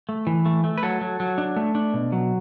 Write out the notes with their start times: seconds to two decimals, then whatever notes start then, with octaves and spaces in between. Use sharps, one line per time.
0.09 A3
0.27 E3
0.45 A3
0.64 A3
0.78 B4
0.83 F#3 A4
1.01 F#3
1.20 F#3
1.38 D4
1.56 A3
1.75 D4
1.94 B2
2.12 F#3